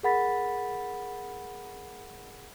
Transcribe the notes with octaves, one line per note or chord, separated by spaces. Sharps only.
G#4 A#4 F#5 B5 A6 B6